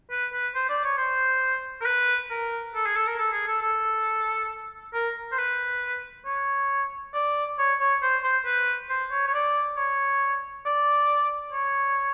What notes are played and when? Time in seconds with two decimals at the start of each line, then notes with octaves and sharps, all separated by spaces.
0.11 B4
0.32 B4
0.55 C5
0.69 D5
0.84 C#5
0.98 C5
1.81 A#4
1.85 B4
2.30 A#4
2.75 A4
2.85 G#4
2.96 A4
3.07 A#4
3.18 A4
3.32 G#4
3.47 A4
3.61 A4
4.94 A#4
5.32 C5
5.38 B4
6.25 C#5
7.14 D5
7.58 C#5
7.80 C#5
8.02 C5
8.23 C5
8.45 B4
8.89 C5
9.11 C#5
9.27 C#5
9.34 D5
9.76 C#5
10.66 D5
11.52 C#5